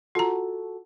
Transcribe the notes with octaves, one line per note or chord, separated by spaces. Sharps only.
F4 F#4 A4 A#5